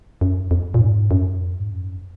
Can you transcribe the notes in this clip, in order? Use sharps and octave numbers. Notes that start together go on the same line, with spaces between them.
F#2
F2
A#2
G#2
F#2
F2
G#2
F#2